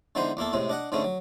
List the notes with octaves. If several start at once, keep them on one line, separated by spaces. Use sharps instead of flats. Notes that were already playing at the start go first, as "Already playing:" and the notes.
D3 E3 G#3 B3 D#4 C5
E2 A#3 E4 A4
A2 C3 G#3
D4 D#5 F#5
G#2 D3 G#3 A3 C#4
F#3